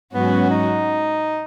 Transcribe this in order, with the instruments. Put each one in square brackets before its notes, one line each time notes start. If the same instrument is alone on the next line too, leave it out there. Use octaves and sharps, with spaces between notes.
[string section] G#2 F#3 C#4 F#4 [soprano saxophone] B3
[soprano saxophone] D#4